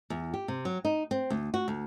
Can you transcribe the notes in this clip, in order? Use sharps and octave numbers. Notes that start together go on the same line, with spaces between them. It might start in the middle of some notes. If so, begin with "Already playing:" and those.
E2
G4
C3
F#3
D#4
C4
D2
F#4
D2